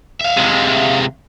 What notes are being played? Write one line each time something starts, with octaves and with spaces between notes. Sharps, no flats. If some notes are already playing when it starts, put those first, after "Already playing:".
E5 F5
C3 G#3